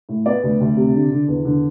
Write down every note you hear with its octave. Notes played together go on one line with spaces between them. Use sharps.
A2
B3 D5
D2
D2
C3
D3
D3
E2
D3